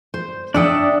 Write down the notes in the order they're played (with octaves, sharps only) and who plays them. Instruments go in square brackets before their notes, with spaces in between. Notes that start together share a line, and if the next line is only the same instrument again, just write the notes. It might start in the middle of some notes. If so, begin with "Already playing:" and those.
[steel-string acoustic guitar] C5
[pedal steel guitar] D4 E5 D#6 [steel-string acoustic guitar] D5 F#5 G5